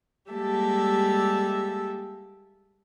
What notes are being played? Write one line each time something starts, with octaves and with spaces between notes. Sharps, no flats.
G3 G#3 A#3 G4 A4 E5